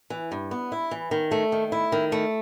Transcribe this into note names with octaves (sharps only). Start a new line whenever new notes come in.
E3
G2
B3
E4
E3
D#3
A3
D#3
E4
D#3
A3